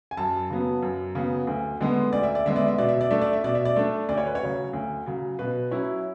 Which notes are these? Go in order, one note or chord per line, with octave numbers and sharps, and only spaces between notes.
G#5
F#2 A5
C#3 F#3 B3
F#2
C#3 F#3 B3
D2
D3 G#3 B3
D2 D5
E5
D5
D3 G#3 B3 E5
D5
E5
B2 D5
E5
D5
A3 D4 E5
D5
E5
B2 D5
E5
D5
A3 D4
D2 D5
C#5
B4
C#5
C#3 F#3
D2
C#3 F#3
B2 B4
F#3 C#4 E4